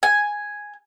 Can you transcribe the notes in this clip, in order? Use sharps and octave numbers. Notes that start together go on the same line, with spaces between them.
G#5